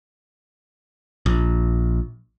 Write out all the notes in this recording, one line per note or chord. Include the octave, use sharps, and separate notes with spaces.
A#1